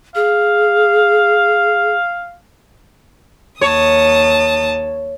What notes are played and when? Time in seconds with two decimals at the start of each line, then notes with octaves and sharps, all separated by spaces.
0.15 G#4 F5
3.61 D#2 C#5 A5 D#6